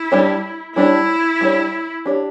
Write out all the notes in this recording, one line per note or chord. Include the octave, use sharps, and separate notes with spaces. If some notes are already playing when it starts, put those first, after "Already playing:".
Already playing: E4
G3 D4 G4 C#5
G3 D4 E4 G4 C#5
G3 D4 G4 C#5
D4 G4 C#5